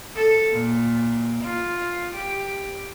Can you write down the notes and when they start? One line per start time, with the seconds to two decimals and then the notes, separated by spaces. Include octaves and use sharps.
0.16 A4
0.52 A#2
1.44 F4
2.15 G4